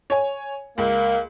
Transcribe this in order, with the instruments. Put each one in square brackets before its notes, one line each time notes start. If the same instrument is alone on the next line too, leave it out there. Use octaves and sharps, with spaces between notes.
[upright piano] C#5 G#5
[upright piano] C#2 [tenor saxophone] A#3